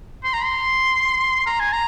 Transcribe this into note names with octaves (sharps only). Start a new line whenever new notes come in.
C6
A#5
C6
A#5
G#5
A#5